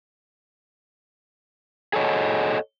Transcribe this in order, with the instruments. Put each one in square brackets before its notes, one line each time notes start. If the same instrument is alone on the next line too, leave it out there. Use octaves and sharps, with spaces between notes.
[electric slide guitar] G#4 A4 C#5 D#5